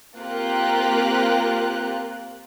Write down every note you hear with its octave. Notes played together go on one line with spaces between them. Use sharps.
A#3 C4 F4 G4 A#4 F#6